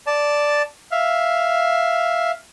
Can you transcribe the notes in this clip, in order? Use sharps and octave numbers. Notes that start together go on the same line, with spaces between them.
D5 A5
E5 F5